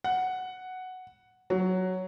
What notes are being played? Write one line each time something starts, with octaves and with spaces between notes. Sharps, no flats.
F#5
F#3